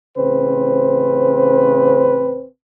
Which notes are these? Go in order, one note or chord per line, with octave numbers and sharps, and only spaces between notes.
A1 C#3 C4 B4 C5